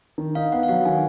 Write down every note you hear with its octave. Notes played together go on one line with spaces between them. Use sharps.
D#3
D#4 F5
B3 F#5
F5
F#3 F#5
D#3 G#5